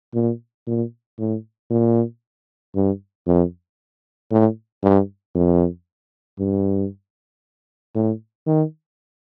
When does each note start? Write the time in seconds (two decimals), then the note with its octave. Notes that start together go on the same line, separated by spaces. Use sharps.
0.15 A#2
0.67 A#2
1.19 A2
1.71 A#2
2.75 G2
3.27 F2
4.31 A2
4.83 G2
5.35 F2
6.39 G2
7.95 A2
8.47 D#3